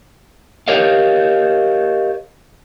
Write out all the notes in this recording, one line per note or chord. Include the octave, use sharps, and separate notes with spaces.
G4 A#4 C#5 D#5 F5